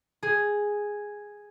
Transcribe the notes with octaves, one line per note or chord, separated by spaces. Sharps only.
G#4